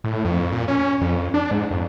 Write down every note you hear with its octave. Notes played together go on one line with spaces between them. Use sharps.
A2
F2
A#2
C#4
F2
D4
G#2
F2